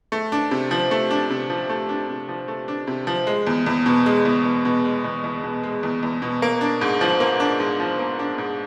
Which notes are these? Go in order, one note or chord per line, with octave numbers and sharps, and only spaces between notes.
A3
D4
C3
F3
A3
D4
C3
F3
A3
D4
C3
F3
A3
D4
C3
F3
G#3
E2
E2
B2
G#3
E2
E2
B2
G#3
E2
E2
B2
G#3
E2
E2
B2
A#3
D4
G#2
F3
A#3
D4
G#2
F3
A#3
D4
G#2